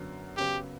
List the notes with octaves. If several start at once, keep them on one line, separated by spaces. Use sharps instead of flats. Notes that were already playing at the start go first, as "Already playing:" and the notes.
Already playing: F#2 D3 F#3 B3 D4
F#2 C#3 F#3 B3 G4